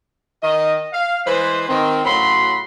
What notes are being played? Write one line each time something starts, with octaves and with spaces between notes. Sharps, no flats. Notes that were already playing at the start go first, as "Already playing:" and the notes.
D#3 D#5
F5
E3 G#3 B4 C5
D#3 C4
A2 C#3 F#3 F#4 B5 C6